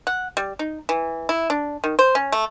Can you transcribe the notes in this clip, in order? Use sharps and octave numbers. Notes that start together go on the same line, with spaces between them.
F#5
G3
D#4
E3
E4
D4
D#3
C5
C#4
A3